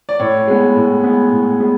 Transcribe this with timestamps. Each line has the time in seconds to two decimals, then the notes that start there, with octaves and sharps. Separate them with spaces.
0.09 D5
0.20 A2 C#5
0.48 G#3 B3
0.76 A2
1.04 G#3 B3
1.31 A2
1.60 G#3 B3